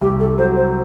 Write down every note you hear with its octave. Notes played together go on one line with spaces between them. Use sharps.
C2 G4
A4
F#3 C5
C5